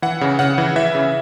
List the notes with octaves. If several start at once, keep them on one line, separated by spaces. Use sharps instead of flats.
E3 F#5
C#3
C#3 F#5
E3
E3 E5
C#3